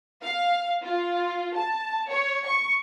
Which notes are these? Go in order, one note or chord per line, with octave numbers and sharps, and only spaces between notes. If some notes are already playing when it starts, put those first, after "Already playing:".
F5
F4
A5
C#5
C#6